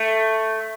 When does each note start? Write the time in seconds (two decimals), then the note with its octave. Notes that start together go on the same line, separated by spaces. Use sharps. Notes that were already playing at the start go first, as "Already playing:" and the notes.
Already playing: A3